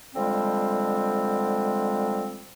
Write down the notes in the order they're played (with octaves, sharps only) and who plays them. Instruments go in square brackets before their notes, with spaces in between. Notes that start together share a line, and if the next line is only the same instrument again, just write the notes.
[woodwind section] D3 F3 G3 G#3 C4